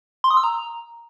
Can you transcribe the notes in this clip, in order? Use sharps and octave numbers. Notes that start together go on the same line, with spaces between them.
C6
D#6
E6
A#5